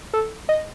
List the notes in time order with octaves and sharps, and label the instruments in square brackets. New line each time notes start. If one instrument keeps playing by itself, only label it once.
[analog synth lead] A4
D#5